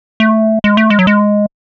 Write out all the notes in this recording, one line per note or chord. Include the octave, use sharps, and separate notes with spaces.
A3
G#3
A3
G#3
F#3
G#3